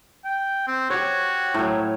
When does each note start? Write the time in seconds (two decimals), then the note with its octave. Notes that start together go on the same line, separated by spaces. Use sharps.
0.25 G5
0.67 C4
0.90 F#4 G4 C#5
1.54 A2 F#3